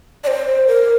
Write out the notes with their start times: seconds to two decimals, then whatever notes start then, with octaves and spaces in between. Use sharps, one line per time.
0.24 D5
0.27 C5
0.67 A#4